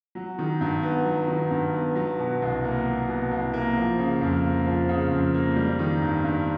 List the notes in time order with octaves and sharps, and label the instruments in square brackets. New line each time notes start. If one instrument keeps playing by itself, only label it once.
[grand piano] F#3
D#3
G2
B3
F#3
D#3
G2
B3
F#3
B2
C2
A#3
F#3
B2
C2
A#3
F3
C#3
F2
A#3
F3
C#3
F2
A#3
G3
D#3
G2
G2